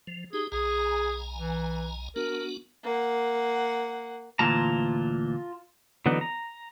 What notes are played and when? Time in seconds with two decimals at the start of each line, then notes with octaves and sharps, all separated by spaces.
0.07 F3
0.33 D#4 G4 G#4
0.52 B1 G#4 G#5 A#5
1.37 E3
2.16 B3 D4 F#4 A#4
2.84 A#3 F#5
4.39 D2 A#2 E3 F4 A5 A#5
6.06 D3 E3 F#3 B3 D#4
6.21 A#5